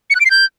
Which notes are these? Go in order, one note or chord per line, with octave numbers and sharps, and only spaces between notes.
C#7
F#6
D7
C7
G6